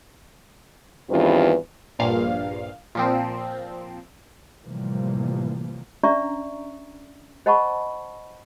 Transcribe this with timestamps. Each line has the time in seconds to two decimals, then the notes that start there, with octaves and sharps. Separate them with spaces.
1.09 E2 G2 D#3 C4 F4 B4
1.99 A#1 G2 A#2 F5
2.95 A#2 F3 C4
4.64 A2 C3 E3 F3 G3 A#3
6.03 C#4 D4 D5 E5 A#5 C#6
7.46 C5 D#5 F#5 A5 B5 C#6